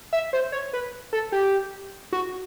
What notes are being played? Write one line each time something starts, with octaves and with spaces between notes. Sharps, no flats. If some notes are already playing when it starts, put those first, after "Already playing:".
E5
C5
C#5
B4
A4
G4
F#4